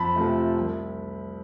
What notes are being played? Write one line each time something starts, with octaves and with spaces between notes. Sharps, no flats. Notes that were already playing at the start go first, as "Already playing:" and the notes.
Already playing: F2 A5 B5
C3 F3 A3
C2